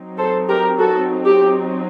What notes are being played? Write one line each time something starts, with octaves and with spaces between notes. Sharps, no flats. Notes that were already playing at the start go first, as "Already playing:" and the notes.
Already playing: F#3 C4 D#4
A4 C5
G4 A#4
F#4 A4
G4